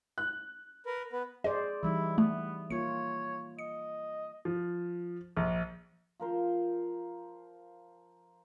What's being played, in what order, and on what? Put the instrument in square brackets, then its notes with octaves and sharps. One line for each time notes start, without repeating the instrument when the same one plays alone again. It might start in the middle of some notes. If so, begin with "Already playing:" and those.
[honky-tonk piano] F#6
[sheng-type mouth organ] A#4 B4
B3 B4
[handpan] G#4 C5 D5 [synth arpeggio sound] D#5
[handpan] E3 G3 D#4 [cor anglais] E4
[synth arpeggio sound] A3 [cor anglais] B3 [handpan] E4
[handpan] A#3 F4 [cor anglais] C#5 [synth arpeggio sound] C#7
[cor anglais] D#5 [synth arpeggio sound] C#7
[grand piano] F3
A#1
[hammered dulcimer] F3 A#4 C5